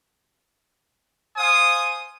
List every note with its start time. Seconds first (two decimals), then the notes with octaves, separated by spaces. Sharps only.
1.37 C5 F5 G#5 D#6